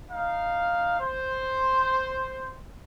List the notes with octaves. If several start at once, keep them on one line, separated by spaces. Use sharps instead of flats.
D#4 F5
C5